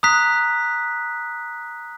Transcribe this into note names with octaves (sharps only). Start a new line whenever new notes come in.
A#5 D#6 F#6 B6